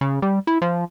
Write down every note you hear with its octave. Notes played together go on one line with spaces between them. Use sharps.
C#3
G3
E4
F3